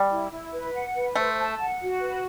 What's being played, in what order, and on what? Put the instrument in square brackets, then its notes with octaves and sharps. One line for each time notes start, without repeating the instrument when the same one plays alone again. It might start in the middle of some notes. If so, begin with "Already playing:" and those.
Already playing: [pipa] G3
[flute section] E4
E4
B4
F#5
B4
[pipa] A3 [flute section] C5
[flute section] A5
F#5
F#4
B4